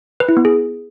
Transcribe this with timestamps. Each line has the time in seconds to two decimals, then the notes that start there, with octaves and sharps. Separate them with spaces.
0.20 B4
0.29 E4
0.37 B3
0.45 G#4